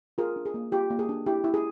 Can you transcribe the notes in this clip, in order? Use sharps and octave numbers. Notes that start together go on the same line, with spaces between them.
F4 G#4 A#4
D4
G#4
A#3
F4 G4
A#3
G#4
D4
E4 G4
E4
G#4